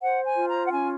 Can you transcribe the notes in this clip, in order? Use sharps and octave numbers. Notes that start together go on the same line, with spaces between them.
C5 F#5
G#5
F4
A#5
F#5
C#4 G#5